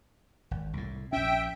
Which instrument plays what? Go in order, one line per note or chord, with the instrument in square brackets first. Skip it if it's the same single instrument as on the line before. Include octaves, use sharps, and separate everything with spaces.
[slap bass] G#1
C2 A2
[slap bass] A#1 C#4 [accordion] E5 G5